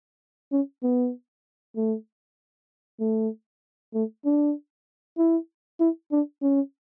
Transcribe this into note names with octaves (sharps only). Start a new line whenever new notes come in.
C#4
B3
A3
A3
A3
D4
E4
E4
D4
C#4